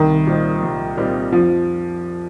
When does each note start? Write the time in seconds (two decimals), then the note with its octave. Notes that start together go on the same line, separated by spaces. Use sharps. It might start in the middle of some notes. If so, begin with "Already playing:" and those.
Already playing: C2 D#3
0.27 A#2 G3 C4 D#4
0.62 C2
0.97 A#2 G3 C4 D#4
1.32 F2 F3